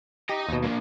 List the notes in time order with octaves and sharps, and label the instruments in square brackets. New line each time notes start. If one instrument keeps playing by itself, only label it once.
[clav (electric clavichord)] G4 [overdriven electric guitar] D#5 A#5
[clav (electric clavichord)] D#2 B2
[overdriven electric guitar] A#3 D4